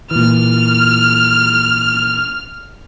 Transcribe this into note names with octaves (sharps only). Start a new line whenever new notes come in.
A#2 E3 F6